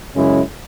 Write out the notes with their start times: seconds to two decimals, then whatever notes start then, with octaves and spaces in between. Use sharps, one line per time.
0.15 F#2 C#3 G#3 C#4 E4